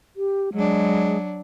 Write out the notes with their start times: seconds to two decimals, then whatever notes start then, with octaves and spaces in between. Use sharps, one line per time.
0.16 G4
0.53 F#3 G#3 D4